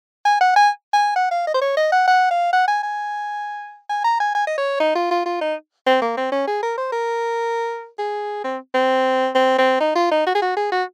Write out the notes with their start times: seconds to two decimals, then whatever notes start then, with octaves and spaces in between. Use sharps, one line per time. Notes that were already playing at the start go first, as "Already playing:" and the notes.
0.25 G#5
0.41 F#5
0.56 G#5
0.93 G#5
1.16 F#5
1.31 F5
1.47 D#5
1.54 C5
1.62 C#5
1.77 D#5
1.92 F#5
2.08 F#5
2.31 F5
2.53 F#5
2.68 G#5
2.83 G#5
3.89 G#5
4.04 A#5
4.20 G#5
4.35 G#5
4.47 D#5
4.58 C#5
4.80 D#4
4.95 F4
5.11 F4
5.25 F4
5.41 D#4
5.86 C4
6.01 A#3
6.17 C4
6.32 C#4
6.47 G#4
6.63 A#4
6.77 C5
6.92 A#4
7.98 G#4
8.44 C4
8.74 C4
9.35 C4
9.58 C4
9.80 D#4
9.95 F4
10.11 D#4
10.27 F#4
10.35 G#4
10.42 F#4
10.56 G#4
10.72 F#4